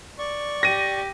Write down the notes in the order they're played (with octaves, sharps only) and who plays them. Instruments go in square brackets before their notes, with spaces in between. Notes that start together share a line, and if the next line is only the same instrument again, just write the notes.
[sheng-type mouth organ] D5 C#6
[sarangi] G4 [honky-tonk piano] A#6 D#7